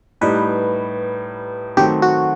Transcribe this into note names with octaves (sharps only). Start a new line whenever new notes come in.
A2 G3 D#4 B4
D#3 F#3 A3 C4 G4
F#4